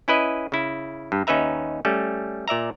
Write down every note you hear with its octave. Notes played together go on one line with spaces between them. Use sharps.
C#4 E4 B4 D#5
C#3 E4
G2
D#2 C#4 D#4 B4 E5 A#5
G3 A3 C#4
A#2 D5 E5 A#5